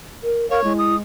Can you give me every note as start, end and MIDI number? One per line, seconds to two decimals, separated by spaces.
0.23 0.48 70
0.50 0.64 70
0.50 0.73 73
0.50 0.59 77
0.64 1.02 56
0.64 0.94 64
0.78 0.96 87